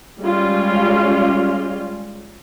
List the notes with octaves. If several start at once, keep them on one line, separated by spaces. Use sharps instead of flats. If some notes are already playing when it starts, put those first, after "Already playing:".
G3 G#3 C#4 F4